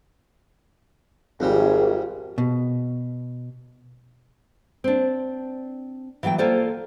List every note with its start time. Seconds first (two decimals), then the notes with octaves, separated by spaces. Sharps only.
1.40 G#1 F2 G3 G#4
2.38 B2
4.84 C4 D4
6.23 E3 F#3 B3 F5 G5
6.38 A#3 F4 A4 C5 D5